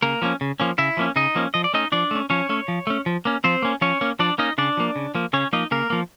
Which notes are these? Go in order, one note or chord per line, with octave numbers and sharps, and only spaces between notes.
C#3 A#3 A#4
F3 A#3 C#4
C#3
F3 A#3 C#4
C#3 E4 E5
F3 A#3 C#4
C#3 D#4 D#5
F3 A#3 C#4
F3 D#5
D5
A3 C#4 D#4 D#5
F3 D4 D5
A3 C#4
F3 C#4 C#5
A3 C#4
F3
A3 C#4
F3
A#3 C#4
F3 C4 C5
A#3 C#4
F3 C#4 C#5
A#3 C#4
F3 D4 D5
A#3 C#4 D#4 D#5
C#3 D4 D5
F3 A#3
C#3
F3 A#3
C#3 C#4 C#5
F3 A#3 D#4 D#5
C#3 A#3 A#4
F3 A#3